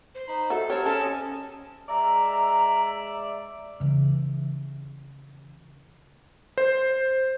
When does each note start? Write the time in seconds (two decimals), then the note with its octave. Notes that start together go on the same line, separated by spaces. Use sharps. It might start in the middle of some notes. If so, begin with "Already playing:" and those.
0.15 C5
0.28 D#4 B5
0.50 F#4 A4 E5
0.70 C4 G4 A#4 C#5 A5
0.86 C#4 A4 A5
1.00 D#5 G#5
1.89 G#3 D5 E5 A#5
3.80 C#3 E3
6.58 C5